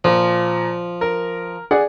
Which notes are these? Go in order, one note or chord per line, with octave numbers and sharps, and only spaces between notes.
A#2 F3
A#4
G#4 D5 F#5